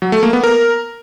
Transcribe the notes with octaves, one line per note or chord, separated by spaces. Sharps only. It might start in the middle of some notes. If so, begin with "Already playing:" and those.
F#3
A3
A#3
B3
A#4